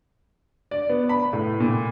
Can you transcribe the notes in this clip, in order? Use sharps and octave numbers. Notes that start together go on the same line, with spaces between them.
D5
B3
B5
A2
A#2